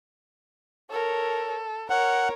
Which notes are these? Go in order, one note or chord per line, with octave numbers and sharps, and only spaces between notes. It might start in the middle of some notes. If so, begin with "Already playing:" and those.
A4 A#4 C#5
A#4 C#5 F#5